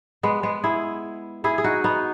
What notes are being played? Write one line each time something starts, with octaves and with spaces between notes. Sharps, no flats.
G#3 B3
G#3 B3
E4 G#4
E4 G#4
G#4
D#4 F#4
B3 D#4